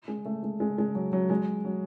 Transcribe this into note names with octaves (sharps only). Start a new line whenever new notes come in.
G#3
A3
G#3
G#3
G#3
F#3
F#3
G#3
F#3